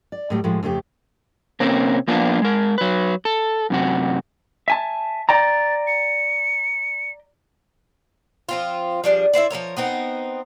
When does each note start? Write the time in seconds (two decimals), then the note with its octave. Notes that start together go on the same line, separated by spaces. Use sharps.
0.12 D5
0.30 A2 F#3 G3 A3
0.44 A2 F3 G3 G#3
0.63 F2 C#3 A3 G4
1.60 C3 A#3 C4 C#4
2.08 F3 A#3 B3 D4 F4
2.42 G#3 A#4
2.78 F#3 B4
3.25 A4
3.70 F#2 C3 F#4
4.68 E5 G#5 A5
5.29 D5 G5 A#5 A6
5.87 C#7
8.49 F3 C4 F4
9.04 F3 G3 D4 G#4
9.34 E4 F4 C5 D5
9.50 F3 A3 A#4 C#5
9.77 B3 C4 D#4 A#4